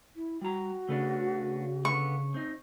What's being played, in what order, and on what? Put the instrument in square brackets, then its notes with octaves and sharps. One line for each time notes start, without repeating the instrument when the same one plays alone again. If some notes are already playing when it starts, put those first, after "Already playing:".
[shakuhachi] E4
[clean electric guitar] G3 A#5 [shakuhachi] F#4
[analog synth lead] C#3 [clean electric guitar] A3 B3 D4
[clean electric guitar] D3 B3 [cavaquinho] C#6
[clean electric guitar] C4 D#4